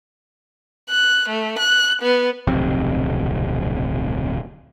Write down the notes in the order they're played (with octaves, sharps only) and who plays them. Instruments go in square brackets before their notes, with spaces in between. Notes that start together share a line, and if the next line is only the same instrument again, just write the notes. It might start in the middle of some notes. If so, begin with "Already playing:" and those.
[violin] F#6
A3
F#6
B3
[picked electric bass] D1 B1 F2 C3